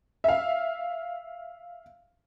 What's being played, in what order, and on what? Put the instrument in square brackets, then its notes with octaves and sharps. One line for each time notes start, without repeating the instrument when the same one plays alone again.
[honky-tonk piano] E5 F5